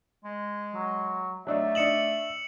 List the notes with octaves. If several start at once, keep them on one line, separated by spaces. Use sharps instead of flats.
G#3
F#3
F#3 A3 D4 D#4 E5
D4 D#5 C#7 E7 F#7